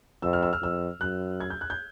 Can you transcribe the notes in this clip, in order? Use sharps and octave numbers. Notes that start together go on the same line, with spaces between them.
F2 E6
F6
E6
F6
F2 E6
F#2 F#6
G#6
G6
F#6
G6